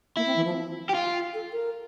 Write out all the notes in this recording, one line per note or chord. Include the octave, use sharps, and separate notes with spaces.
A#3 E4
C4
E3
F3
G4
F4
A4
A#4